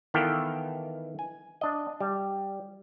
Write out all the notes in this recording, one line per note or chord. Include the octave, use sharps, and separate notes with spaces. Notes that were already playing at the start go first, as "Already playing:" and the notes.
D#3 E3 B3 A4 F5 G5
G#5
D4 D#5
G3